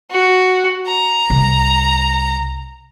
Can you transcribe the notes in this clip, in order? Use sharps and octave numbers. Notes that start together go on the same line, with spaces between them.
F#4
A#5
C2